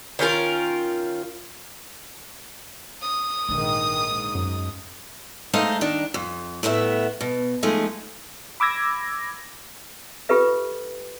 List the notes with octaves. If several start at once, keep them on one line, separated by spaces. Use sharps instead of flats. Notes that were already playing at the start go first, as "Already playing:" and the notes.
D#3 C#4 F4 A#4
D#6
A#1 G#2 D3 D#3
G#2
F#2
G#3 A3 D#4 C5 D#5 F5
D#3 D4
F2
A2 A3 B3 B4 E5
B2
F3 G#3 A3 D#4
B5 D6 E6 G#6 A#6
F4 G4 A4 B4 E5